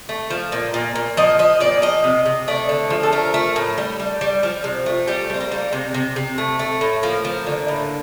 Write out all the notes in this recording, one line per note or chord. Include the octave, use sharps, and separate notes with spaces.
A3
F3
A#2
A#2
A#2
F3 D#5
F3 D#5
A#2 D5
F3 D#5
C3
C3
A3 D5
D3
F3
A4
A3 A#4
A3
A2
G3
G3
G3
F3
C3
A3
G3 G4
G3 C4
A#3
G3
C3
C3
C3
A3
A3
A2
F3 A#3
F3
D3
A2